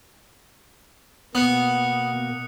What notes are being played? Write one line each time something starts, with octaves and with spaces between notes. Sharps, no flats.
B2 A#3 B3 D#6 F#6 C#7